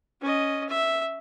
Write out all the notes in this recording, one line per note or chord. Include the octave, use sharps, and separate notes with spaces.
C#4 D#5
E5